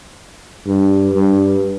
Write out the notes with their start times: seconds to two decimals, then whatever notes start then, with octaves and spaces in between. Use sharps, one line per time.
0.67 G2
1.14 G2